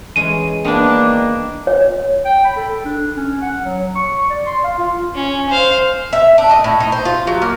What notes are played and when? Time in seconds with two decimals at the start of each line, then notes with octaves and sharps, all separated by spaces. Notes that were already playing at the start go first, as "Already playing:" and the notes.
0.16 E3 G#3 C#4 D#7
0.65 D#3 A#3 B3 D4 E4
1.67 C#5
2.25 G5
2.45 B5
2.57 A4
2.85 D4
3.17 C#4
3.42 F#5
3.65 F#3
3.95 C#6
4.30 D5
4.46 C6
4.64 F5
4.78 F4
5.15 C#4
5.49 C5 F5
6.13 E5
6.38 D4
6.51 D#5
6.64 A2
6.80 D#4
6.92 C5
7.05 F4
7.27 F#3
7.42 A#3